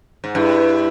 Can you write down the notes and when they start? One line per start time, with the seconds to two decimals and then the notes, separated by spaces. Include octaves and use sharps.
0.24 G#2
0.35 G2 E4